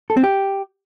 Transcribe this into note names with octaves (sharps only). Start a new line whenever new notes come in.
A4
C4
G4